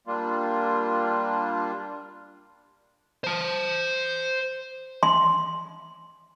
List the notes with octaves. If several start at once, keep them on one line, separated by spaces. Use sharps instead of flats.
G3 A#3 D4 F4
C5 A5
C6